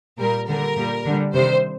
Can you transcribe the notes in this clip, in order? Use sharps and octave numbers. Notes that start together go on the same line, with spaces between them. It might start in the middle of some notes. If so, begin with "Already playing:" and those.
A#2 G3 A#4
D3 G3 A#4
A#2 G3
D3 G3
C3 D#3 G3 C5